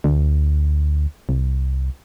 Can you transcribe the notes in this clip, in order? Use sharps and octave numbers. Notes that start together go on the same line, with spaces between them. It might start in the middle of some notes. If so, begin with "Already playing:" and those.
D2
C2